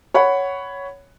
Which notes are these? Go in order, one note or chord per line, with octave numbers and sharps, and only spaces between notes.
C#5 F#5 B5